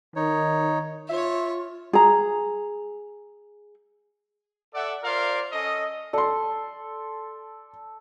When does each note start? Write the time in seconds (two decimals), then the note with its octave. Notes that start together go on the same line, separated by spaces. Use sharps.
0.16 D#3 D#4 C#5
1.09 F4 C#5 E5
1.93 G#4 A#5
4.75 A4 D5 E5 F#5
5.04 F4 A#4 C5 D5 F5
5.52 C#4 A4 D#5
6.13 A4 D5 C6